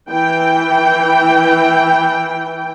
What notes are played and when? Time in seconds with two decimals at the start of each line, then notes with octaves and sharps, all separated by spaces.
0.11 E3 G5